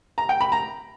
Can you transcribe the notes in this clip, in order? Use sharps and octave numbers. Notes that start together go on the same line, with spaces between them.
A#5
G5
B5
A#5